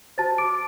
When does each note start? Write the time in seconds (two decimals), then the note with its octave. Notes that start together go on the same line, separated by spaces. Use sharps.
0.18 F#4 C5 A5 A6
0.38 D6 D7